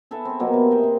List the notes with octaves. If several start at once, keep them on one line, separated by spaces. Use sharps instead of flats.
G#4 A4 B4 E5
C4 E5
B2 F#3 A#3 B3
C3
D#5 E5 G5
C3